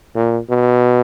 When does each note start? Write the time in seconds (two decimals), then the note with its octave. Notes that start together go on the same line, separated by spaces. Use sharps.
0.15 A#2
0.49 B2